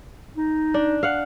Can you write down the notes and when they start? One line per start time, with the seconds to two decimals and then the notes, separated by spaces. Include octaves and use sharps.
0.37 D#4
0.74 D4
1.03 F5 F#5